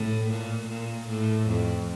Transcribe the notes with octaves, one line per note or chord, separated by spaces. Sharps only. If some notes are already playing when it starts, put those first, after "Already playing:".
Already playing: A2
A#2
A#2
A2
F2